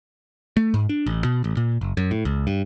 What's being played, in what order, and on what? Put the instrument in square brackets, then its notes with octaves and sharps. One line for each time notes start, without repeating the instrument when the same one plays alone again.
[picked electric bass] A3
G#2
D4
A1
B2
A1
A#2
F#1
F#2
A2
C#2
G2